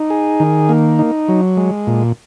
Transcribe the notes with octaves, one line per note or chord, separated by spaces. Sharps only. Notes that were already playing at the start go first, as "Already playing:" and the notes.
Already playing: D#4
G#4
D#3
A#3
D#4
F#3
G#3
A#2